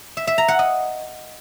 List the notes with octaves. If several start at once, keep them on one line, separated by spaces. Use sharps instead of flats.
E5
E5
A#5
F#5
D#5